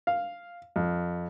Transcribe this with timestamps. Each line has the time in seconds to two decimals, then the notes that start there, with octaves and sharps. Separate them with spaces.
0.07 F5
0.76 F2